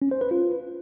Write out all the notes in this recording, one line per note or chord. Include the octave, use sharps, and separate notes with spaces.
C#4
C5
B4
F4